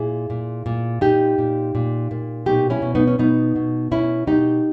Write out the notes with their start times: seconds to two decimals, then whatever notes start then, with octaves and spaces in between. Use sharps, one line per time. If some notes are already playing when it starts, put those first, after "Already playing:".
Already playing: A#2 E4 G#4
0.30 A#2
0.66 A#2
1.01 A#2 D#4 G4
1.38 A#2
1.75 A#2
2.11 A#2
2.46 B2 D#4 G4
2.70 C#4 E4
2.82 B2
2.95 B3 D#4
3.08 C#4
3.19 B2 B3 D#4
3.56 B2
3.91 B2 C#4 E4
4.27 B2 D#4 G4